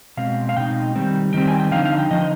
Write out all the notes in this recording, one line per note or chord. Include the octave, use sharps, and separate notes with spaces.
B2 G#3 C4 F5
F5
B2 G#3 C4 D#4 G5
D#3 G3 C4
D#3 G3 C4 G5
G#5
G5
D3 F3 C4 D#4 F5
F5
G5
D3 F3 C4 D#4 D#5